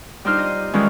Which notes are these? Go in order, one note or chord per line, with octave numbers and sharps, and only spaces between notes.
G3 D4 D#4 F4 C5 F6
D#5
D#3 E3 G3 G#3 C#4 F4